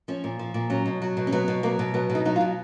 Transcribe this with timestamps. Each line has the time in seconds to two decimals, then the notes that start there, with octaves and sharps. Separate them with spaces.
0.08 F3 C#4
0.24 A#2
0.39 F3
0.54 A#2
0.70 F#3 C#4
0.86 B2
1.02 F#3
1.17 B2
1.27 C#4
1.32 F#3 B3
1.48 B2
1.63 F#3 A#3
1.79 B2
1.94 F#3 B3
2.10 B2
2.15 D#4
2.25 F#3 D#4
2.36 F4
2.41 B2